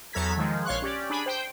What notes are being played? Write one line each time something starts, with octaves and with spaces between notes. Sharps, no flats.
E2 F#3 A4 A#5 G#6 B6
D#3 F3 G#3
A#1 C#5 F5 C6 C#6 F#6
C#4 G4 D5
D4 G#4 B5
C5 G5